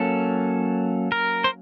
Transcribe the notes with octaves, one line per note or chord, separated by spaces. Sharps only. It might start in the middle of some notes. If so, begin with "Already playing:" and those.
Already playing: F#3 A#3 C#4 A4
A#4
C5